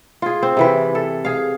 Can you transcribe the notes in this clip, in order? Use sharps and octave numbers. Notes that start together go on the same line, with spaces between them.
F4 G#4
C4
C3 E3 B4
A4
G#4 F5